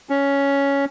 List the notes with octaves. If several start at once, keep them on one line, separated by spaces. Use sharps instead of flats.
C#4